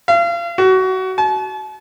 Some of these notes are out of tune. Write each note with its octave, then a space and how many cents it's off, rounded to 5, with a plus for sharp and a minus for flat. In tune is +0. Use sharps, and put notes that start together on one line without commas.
F5 -35
F#4 +25
A5 -40